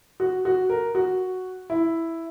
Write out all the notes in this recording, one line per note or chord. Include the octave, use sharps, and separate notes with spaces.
F#4
F#4
A#4
F#4
E4